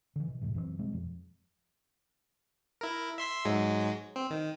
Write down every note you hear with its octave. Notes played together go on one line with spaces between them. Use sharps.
D3 E3
B2
F2 A2 C3 E3
F#2 E3 G#3 C4
B2 G3 G#3 C4
F2 F3
E4 A#4
E5 C6 B6
G#2 F#3 G#3
C4
D#3